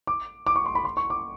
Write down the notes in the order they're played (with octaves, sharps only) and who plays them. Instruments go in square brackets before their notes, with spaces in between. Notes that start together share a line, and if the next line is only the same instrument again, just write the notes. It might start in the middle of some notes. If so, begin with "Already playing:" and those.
[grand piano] D6
D6
C#6
C6
B5
C6
C#6
D6